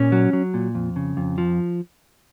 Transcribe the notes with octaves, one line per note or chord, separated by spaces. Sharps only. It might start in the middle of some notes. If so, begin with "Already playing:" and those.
Already playing: A#2 C#4
F#3
F#3
A#2
F2
C#3
F2
F3